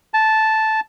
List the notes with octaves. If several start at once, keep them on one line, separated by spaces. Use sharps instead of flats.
A5